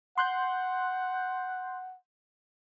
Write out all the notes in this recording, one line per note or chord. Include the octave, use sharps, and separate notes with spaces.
F#5 C6 F#6 G6